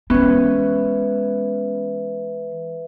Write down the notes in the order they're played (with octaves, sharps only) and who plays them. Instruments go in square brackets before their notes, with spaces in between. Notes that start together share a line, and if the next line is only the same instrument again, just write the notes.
[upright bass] E3 G#3 [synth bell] B3 C#4 [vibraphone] B4 E5